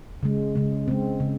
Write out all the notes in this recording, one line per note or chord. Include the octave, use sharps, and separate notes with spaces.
C#3 G#3
C#3 G#3
C#3 G#3 C4
C#3